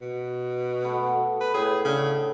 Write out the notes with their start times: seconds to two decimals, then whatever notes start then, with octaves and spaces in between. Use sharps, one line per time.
0.01 B2
0.84 A3 B3
1.41 B4
1.54 A2 G#4
1.85 C#3 D4